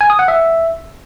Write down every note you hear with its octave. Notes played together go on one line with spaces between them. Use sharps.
G#5
D#6
F#5
E5